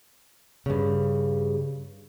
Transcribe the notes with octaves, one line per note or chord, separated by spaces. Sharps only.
G2 C#3